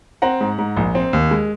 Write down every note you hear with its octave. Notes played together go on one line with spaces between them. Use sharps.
C4 F#5 A#5
G#2
G#2
A#1
C4
D#2
G#3